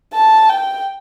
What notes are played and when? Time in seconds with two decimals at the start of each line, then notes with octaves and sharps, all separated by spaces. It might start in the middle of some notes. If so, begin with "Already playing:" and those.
0.13 A5
0.50 G5